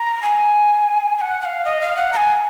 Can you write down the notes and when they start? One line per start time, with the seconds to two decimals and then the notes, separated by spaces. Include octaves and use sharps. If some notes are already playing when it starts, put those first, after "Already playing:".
Already playing: A#5
0.23 G#5
1.18 G#5
1.21 F#5
1.41 F#5
1.45 F5
1.65 D#5
1.81 F5
1.97 F#5
2.13 A#5
2.17 G#5